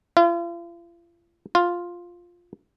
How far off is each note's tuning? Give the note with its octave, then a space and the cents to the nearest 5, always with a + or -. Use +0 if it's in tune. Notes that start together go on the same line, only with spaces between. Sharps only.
F4 -40
F4 +5